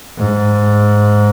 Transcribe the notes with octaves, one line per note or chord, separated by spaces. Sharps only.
G#2